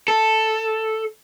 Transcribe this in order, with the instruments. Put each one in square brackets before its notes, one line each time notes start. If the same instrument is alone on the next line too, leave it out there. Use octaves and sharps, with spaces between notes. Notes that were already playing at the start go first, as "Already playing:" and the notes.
[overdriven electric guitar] A4